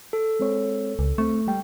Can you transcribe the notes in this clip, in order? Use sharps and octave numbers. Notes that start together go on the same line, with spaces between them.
A4
G#3 C4 C#5
C#2
A3 C4 C#6
G3 G5